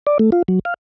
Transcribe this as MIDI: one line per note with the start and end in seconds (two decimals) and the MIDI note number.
0.07 0.18 74
0.19 0.30 57
0.32 0.42 65
0.48 0.59 54
0.65 0.74 77